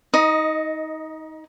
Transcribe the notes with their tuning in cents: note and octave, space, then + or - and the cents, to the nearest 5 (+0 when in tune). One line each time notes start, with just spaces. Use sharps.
D#4 +25 D#5 +0